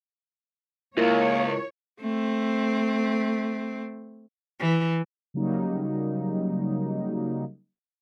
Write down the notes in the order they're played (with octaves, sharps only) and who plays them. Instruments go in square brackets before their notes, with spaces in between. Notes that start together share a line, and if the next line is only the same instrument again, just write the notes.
[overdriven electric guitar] C#2 G#2 [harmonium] A#3 [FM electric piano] E4 F4 A#4 [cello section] C#5
[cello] A3 C4
[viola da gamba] E3
[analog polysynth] C#3 F#3 G3 A#3 D#4